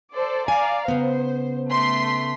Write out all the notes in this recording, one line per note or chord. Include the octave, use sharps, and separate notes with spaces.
A4 C5 D5
D5 F5 G#5 A#5
C#3 B3 C5
A3 C6 B6